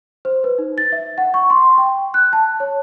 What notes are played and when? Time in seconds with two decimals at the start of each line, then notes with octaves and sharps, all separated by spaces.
0.25 C5
0.44 B4
0.58 D#4
0.78 A6
0.92 E5
1.18 F#5
1.34 C#6
1.50 C6
1.78 G5
2.14 F#6
2.33 A5
2.60 C#5